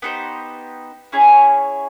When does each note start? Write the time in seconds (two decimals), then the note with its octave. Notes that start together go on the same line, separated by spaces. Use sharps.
0.02 B3 D#4 G4 C5
1.12 C#4 E4 G#4 C#5